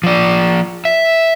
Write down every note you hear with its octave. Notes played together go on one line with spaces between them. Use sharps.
F3 D5
E5